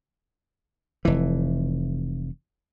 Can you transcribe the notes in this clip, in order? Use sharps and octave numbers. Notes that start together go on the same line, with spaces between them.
F1 E3